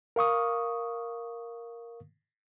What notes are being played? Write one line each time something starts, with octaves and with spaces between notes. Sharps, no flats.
A#4 F5 C#6 D#6